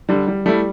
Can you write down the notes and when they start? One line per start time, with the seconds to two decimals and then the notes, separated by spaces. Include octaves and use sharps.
0.09 D3 G3
0.28 G3
0.46 G3 A3 E4